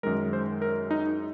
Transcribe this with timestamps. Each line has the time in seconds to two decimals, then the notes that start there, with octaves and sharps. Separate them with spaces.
0.03 F#2 D#3 G#3 A#4
0.33 C5
0.62 A#4
0.91 D#4